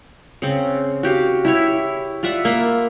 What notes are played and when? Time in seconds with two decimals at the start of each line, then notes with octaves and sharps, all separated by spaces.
0.42 C#3 C4
1.03 F#4 G4 F5
1.45 E4 G4 C#5
2.23 F4 D5 E5 F#5
2.45 A#3 B5